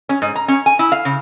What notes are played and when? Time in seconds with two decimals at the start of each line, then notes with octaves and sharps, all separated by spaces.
0.09 C#4
0.22 G#2
0.36 A#5
0.48 C#4
0.66 G#5
0.79 E4
0.92 F5
1.05 C#3